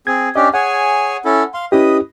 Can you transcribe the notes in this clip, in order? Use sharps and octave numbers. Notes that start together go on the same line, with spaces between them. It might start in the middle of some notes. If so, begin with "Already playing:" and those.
C4 G#4 G#6
C#4 D4 G4 D#5
G#4 C#5 F#5 G#5
C#4 E4 A4
F5 C6
C#4 E4 G4 B4 D#5 D#6